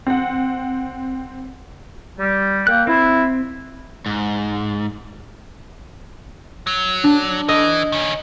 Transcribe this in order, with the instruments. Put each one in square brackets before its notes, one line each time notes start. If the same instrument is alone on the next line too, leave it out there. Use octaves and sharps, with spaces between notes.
[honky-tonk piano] C4 F#5
[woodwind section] G3
[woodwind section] A#3 G5 [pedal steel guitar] F#6
[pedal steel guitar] C4 [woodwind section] E4
[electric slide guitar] G#2
[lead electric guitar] F#3
[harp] D4
[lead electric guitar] E3 [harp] D#5
[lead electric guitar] D#3 C#4